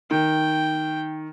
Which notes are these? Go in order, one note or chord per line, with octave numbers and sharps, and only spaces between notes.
D#3 G5